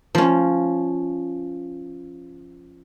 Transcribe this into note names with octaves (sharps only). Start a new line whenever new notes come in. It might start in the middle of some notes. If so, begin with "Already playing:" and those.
F3 C#4